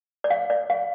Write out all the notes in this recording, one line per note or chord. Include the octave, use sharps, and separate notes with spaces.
D5
F5
D5
F5